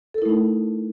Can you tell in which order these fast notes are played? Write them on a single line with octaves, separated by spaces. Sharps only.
A4 A#4 E4 A3 D#4